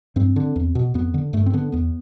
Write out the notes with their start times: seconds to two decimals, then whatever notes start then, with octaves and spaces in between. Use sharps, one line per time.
0.16 G2 C4
0.36 D3
0.56 E2
0.75 B2
0.94 F2 B3
1.14 D3
1.33 G2 A3
1.46 C4
1.53 D3 B3
1.72 E2 B3